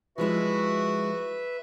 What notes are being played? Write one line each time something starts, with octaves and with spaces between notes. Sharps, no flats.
F3 G#3 E4 F#4 B4 E5